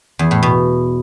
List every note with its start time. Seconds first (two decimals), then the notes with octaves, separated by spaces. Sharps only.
0.19 E2
0.31 A2
0.43 B2